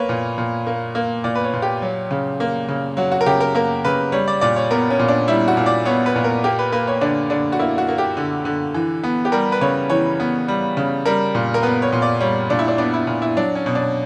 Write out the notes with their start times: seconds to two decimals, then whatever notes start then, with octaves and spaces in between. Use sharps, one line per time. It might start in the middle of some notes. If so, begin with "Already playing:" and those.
Already playing: A#3 B4 C#5
0.09 A#2
0.38 A#2
0.67 A#3
0.95 A#3
1.24 A#2 D5
1.35 B4
1.44 C#5
1.53 A#2
1.62 G4
1.82 F#3
2.11 C#3
2.40 A#3
2.69 C#3
2.97 F#3 F#4
3.12 F#4
3.21 A#4
3.26 C#3 G4
3.41 A#4
3.55 A#3 A#4
3.85 C#3 B4
4.12 G3 C#5
4.28 D5
4.41 A#2 D5
4.56 C#5
4.71 B3 A#4
4.90 C#4
4.99 A#2
5.08 D4
5.28 G3 E4
5.48 F#4
5.57 A#2
5.66 D5
5.85 B3 C#5
6.06 B4
6.16 A#2
6.24 A#4
6.44 A#3 G4
6.59 B4
6.72 A#3 B4
6.88 C#5
7.01 D3 D4
7.30 D3 D4
7.52 F#4
7.59 A#3 E4
7.78 F#4
7.88 A#3
7.98 G4
8.17 D3
8.45 D3
8.74 E3
9.03 B3
9.25 G4
9.32 G3 A#4
9.52 B4
9.61 C#3 C#5
9.90 E3 C#5
10.20 B3
10.48 G3
10.77 C#3
11.06 G3 A#4
11.35 A#2
11.54 A#4
11.63 B3 B4
11.82 C#5
11.92 A#2
12.02 D5
12.20 G3 C#5
12.50 A#2 D4
12.59 E4
12.68 D4
12.78 B3 D4
12.94 E4
13.07 A#2
13.22 E4
13.37 F#3 D4
13.55 C#4
13.66 B2
13.75 D4